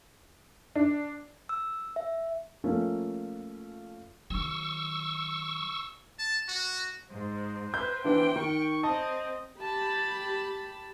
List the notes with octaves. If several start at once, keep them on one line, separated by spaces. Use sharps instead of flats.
D4
E6
E5
F3 A3 A#3 C#4
D#3 F#3 C#6 E6
A5
F#4
G#2 C5
B4 G6
E3 B3 D4 G5
D#3 C#6
C4 D#5 A5
G4 A5 B5